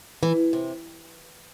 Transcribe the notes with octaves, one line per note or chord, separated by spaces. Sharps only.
E3
C3